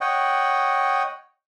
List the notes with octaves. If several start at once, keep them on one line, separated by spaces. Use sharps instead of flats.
C#5 D#5 F#5 G5